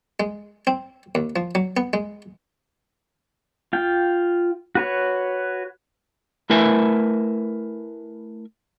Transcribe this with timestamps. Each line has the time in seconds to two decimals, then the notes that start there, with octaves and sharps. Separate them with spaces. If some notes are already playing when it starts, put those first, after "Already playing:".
0.20 G#3
0.67 C4
1.15 D#2
1.36 F3
1.55 F#3
1.77 B3
1.93 G#3
3.73 F4 G5
4.75 F#4 B4 C#5
6.50 A3 E4 A#4 B4 E5 G#5